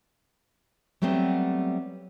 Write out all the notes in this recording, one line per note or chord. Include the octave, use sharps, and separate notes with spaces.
F#3 G3 A3 B3 C4